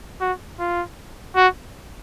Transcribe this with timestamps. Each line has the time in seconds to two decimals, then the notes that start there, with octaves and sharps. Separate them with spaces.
0.21 F#4
0.60 F4
1.36 F#4